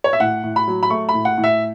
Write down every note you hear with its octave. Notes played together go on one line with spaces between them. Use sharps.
C#5
E5
A2 F#5
A2
B5
F#3
B5
A3 C#6
B5
A2
F#5
A2
E5